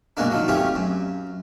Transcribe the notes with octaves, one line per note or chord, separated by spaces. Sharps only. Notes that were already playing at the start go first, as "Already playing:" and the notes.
F#2 B2 G#3 A#3 B3 D4
D#3 F3 F#3
A3 C4 C#4 F4 G4
F#2